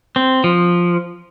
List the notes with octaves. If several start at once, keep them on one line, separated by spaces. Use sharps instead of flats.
C4
F3